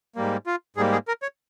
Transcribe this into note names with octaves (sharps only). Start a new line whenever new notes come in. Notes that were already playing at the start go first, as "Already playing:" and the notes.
G#2 G3 A#3
F4
G#2 G3 A#3 G#4
G#4
A#4
C#5